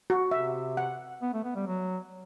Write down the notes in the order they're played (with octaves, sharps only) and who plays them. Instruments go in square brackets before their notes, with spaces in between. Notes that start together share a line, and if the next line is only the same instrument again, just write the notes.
[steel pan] F#4
[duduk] C3 [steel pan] E5
[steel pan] F#5
[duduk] B3
A3
B3
G3
F#3